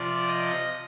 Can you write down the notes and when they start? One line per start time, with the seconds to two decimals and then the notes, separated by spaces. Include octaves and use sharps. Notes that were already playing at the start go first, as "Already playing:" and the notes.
Already playing: C3 F3 D5
0.28 D#5